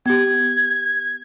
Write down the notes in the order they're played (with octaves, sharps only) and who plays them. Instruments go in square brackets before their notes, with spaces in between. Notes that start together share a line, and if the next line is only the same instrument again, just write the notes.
[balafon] B3 G4 [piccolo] G#6